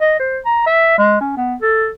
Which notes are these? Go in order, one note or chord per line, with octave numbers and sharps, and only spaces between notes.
D#5
C5
A#5
E5
G#3
C#4
B3
A4